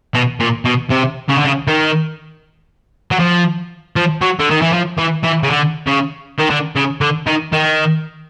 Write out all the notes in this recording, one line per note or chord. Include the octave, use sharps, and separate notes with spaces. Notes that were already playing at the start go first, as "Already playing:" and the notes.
B2
A#2
B2
C3
C#3
D3
C#3
D#3
F#3
F3
F3
F#3
D3
D#3
E3
F3
E3
E3
C#3
D3
C#3
D#3
D3
C#3
D3
D#3
D#3